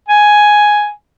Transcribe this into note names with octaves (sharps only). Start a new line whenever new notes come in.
G#5